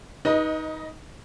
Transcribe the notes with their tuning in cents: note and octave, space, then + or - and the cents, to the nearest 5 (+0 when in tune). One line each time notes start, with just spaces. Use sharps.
D#4 +15 B4 -30 D#5 +0